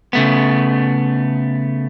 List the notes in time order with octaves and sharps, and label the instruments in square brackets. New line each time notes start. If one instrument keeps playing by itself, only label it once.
[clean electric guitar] C#3 A3 B3